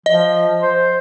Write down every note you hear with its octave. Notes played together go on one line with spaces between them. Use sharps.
F3 D#5
C5